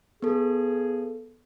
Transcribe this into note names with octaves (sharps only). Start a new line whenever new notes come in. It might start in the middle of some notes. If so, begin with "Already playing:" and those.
B3 G#4 A4